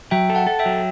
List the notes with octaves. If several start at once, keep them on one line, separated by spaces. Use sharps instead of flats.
F#3 E5 G5
A4
F#5 A5
A4
E5 G5
F#3